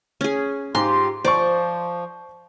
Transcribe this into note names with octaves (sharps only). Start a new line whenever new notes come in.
C#4 G#4
G#2 F4 G4 C6
F3 C5 D5 C#6